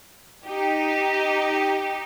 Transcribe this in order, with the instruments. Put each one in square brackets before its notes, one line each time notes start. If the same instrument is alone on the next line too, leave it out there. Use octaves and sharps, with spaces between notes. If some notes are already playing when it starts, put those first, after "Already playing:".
[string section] D#4 G4